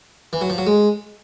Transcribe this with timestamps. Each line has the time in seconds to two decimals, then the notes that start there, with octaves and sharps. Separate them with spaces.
0.33 E3
0.41 F#3
0.50 F3
0.58 F#3
0.67 G#3